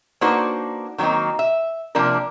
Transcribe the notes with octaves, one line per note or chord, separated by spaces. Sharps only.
A#3 D4 D#4 F#4 B4 C5
D#3 F#3 A#3 C4 D#4
E5
C3 F3 A#3 D4 A#4